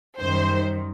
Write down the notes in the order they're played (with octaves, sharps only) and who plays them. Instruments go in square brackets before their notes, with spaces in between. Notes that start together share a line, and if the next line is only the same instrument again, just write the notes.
[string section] F#2 D#3 G3 C5